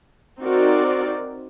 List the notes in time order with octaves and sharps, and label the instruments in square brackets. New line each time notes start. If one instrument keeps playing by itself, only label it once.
[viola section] C4 D#4 F#4 A#4 D5